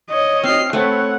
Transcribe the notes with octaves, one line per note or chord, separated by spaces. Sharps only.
C#5 D#5
C4 F6 C7
A3 C4 B4 C#5 F#5